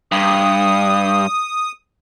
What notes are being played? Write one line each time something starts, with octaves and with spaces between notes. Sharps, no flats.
G2 D#6